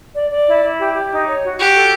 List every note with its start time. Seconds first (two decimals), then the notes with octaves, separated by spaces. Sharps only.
0.15 D5
0.31 D5
0.47 E4
0.63 E4
0.79 G4
0.94 G4
1.11 D#4
1.26 C#5
1.43 F#4
1.59 F#4 G4
1.75 A4